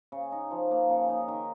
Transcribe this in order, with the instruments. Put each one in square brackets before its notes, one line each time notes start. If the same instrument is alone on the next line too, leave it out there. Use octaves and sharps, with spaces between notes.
[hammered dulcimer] C#3
D#4
F3
A#3
C#3
D#4
D#3